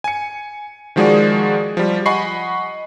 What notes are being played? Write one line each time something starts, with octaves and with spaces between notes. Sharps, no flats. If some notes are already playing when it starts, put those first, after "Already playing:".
G#5 C#7
D#3 F3 G#3 F#4 G#4 D5
F3 G3
D#5 F#5 G#5 B5 C#6 C7